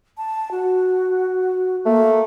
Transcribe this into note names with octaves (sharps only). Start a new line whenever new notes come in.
A5
F#4
A3 A#3